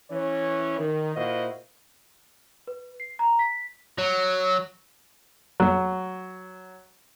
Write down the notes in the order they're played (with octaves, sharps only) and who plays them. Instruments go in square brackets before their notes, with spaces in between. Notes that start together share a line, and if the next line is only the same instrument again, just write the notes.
[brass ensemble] E3 C#4 C#5
D#3
A#2 E4 F#4 C5 D#5 F5
[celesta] B4
C7
A#5
B6
[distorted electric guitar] F#3
[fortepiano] F#3